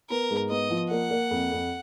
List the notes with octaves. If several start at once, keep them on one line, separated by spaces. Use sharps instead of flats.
B3 A#4
G#2
B3 D#5
F3
A#3 F#5
A#3
F2
F2